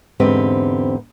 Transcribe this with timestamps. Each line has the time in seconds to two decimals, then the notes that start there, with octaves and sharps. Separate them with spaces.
0.20 E2 G#2 D3 C4 G4 B4